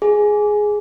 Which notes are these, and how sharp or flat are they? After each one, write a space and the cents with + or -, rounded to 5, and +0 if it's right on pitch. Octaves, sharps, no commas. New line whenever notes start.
G#4 +10